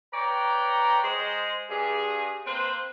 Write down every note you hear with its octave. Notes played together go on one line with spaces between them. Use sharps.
B4 C#5 D5 G5 A#5
G#3 G#4 C5
G2 G#4
A#3 C4 B4 C5